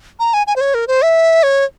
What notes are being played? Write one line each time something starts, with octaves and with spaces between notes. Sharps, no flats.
A#5
G#5
G#5
C5
C#5
A#4
C5
E5
C#5